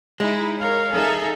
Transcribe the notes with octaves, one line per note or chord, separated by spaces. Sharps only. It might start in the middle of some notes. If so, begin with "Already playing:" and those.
G#3 D#4 E4
A#4 C#5 F5
D#4 G#4 A4 E5